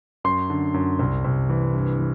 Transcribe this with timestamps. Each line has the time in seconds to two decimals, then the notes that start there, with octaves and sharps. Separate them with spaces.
0.24 F#2 C6
0.50 D3
0.74 F#2
0.99 C2
1.24 C2
1.49 E3
1.74 G2
1.99 E3